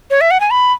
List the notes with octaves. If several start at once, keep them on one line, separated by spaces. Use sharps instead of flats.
C#5
E5
F#5
G#5
B5